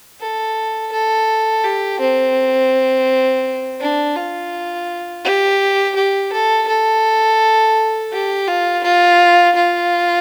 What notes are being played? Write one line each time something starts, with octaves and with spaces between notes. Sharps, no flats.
A4
A4
G4
C4
D4
F4
G4
G4
A4
A4
G4
F4
F4
F4